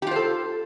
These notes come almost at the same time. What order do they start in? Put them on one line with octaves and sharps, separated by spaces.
G4 F4 C5 A4